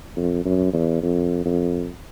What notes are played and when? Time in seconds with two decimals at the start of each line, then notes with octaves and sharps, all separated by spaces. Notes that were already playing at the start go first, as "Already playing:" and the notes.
0.17 F2
0.45 F#2
0.73 E2
1.02 F2
1.45 F2